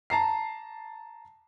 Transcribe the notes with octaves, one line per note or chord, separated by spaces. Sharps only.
A5 A#5 C7